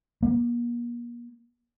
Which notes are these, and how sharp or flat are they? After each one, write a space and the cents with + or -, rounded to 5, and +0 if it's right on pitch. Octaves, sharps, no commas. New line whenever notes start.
A#3 +40